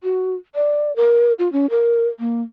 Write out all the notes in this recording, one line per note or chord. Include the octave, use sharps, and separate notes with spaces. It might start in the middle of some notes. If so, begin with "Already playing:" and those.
F#4
D5
A#4
F4
C#4
A#4
A#3